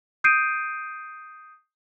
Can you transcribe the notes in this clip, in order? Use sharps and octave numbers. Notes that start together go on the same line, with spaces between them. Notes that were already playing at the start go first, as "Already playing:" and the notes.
D#6 G6 C7 D7 D#7